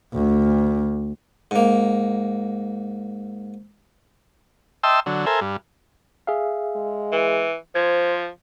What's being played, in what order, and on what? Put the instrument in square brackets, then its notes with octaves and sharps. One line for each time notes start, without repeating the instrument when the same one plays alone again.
[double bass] D2
[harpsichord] G#2 A#3
[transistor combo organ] D#5 E5 G5 A5 C6 E6
D3 F#3
A4 A#4 C5 E5 G#5
G2
[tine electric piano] G#4 E5 F5
[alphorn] G#3
[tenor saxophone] E3
[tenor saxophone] F3 [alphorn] C5 [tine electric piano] G#6